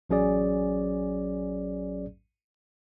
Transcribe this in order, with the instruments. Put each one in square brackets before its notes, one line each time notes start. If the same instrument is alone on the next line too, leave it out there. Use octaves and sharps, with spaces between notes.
[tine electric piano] A1 F#3 C#4 G#4 D5